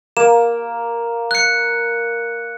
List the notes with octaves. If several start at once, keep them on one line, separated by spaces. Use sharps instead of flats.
A#3 E7
F#6 C#7